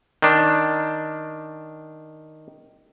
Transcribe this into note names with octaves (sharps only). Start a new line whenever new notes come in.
D#3 D4